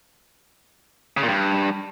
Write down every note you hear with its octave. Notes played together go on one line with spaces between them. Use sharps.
C#3
A#2
G2